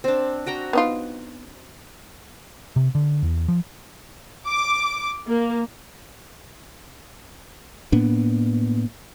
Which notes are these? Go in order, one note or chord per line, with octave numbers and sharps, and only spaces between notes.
C4 D4
F#4 G5 A#5
B3 D#4 F4
C3
D3
E2
F3
D6
A#3
A2 A#3 B3 D4